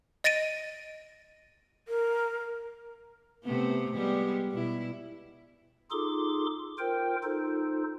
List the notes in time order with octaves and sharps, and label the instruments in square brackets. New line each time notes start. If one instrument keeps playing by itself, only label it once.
[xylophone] D#5 A6 A#6 D7 D#7
[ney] A#4
[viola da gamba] C3 A3 B3
G3 G#3 B3
B2 E4
[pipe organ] D#4 F4 G#4 A4 C6 D6
F4 A#4 C5 G5
D#4 F4 A4 C5